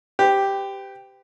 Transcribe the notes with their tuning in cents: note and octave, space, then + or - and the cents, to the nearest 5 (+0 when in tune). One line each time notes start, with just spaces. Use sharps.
G4 +0 B4 +45